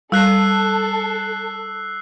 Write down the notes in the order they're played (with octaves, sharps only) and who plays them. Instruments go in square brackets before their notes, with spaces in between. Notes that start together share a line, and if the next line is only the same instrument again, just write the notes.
[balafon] G3 [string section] A4 [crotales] E6 F#6 C7